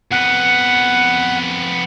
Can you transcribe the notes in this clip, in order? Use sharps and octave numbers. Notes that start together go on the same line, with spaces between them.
F2 B3 F#5